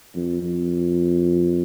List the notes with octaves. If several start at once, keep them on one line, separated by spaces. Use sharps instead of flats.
F2
F2